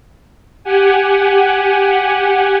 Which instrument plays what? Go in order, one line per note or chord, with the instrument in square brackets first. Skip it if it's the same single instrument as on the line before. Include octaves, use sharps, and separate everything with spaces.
[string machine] G4 F#5 G#5